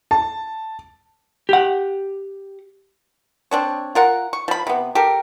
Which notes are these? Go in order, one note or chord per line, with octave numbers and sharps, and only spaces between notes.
A5
G4 F#5
C4 D4 C#5
F4 A#4 F#5
C#6
F3 B5
C3 B3
G4 A4 A#4